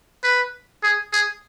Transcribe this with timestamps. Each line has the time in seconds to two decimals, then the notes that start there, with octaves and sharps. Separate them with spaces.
0.23 B4
0.83 G#4
1.12 G#4